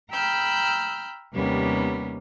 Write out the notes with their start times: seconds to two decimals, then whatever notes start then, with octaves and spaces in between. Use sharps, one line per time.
0.11 G5 A#5 B5 E6 F6 G6
1.34 D#2 C3 G3 A#3 B3 C#4